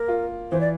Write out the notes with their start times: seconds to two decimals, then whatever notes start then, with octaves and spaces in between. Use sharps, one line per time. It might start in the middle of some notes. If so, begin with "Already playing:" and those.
Already playing: A#3 A#4
0.08 F4
0.52 E3 C5
0.61 D5